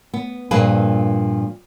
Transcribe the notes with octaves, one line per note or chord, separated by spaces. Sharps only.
B3
G2 A#2 F3 A#3 G#4 B4